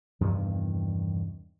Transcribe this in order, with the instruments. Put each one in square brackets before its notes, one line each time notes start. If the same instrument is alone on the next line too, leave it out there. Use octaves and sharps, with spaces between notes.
[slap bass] E2 G2 C3 D#3